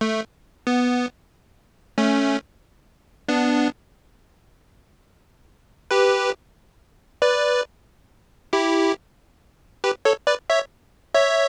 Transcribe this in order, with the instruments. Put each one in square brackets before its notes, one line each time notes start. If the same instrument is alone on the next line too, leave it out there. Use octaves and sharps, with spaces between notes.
[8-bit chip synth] A3
B3
A3 C#4
B3 D4
G4 B4
B4 D5
E4 G4
G4 B4
A4 C#5
B4 D5
C#5 E5
C#5 E5